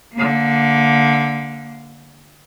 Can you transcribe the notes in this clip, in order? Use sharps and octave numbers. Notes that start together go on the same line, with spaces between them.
D3 A#3